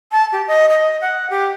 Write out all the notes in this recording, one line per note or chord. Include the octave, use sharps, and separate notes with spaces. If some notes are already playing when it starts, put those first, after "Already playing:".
A5
G4
D#5
D#5
F#5
G4